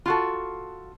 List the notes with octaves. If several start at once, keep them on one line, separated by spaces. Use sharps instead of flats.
F4 F#4 A4